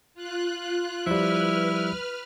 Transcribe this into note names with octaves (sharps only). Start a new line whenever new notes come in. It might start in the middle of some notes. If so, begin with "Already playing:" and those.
F4 F#6
F3 G3 E4 B4 F6